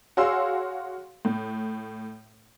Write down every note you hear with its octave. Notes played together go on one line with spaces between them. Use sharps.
F#4 G#4 C#5 F5 C6 E6
A2